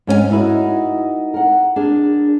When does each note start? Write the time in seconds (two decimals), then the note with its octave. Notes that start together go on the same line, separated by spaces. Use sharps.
0.07 G#2 C#4 A#4 G#5
0.31 D#4 E4 F#4 A#4
1.34 A#4 F#5
1.76 D4 G#4 A#4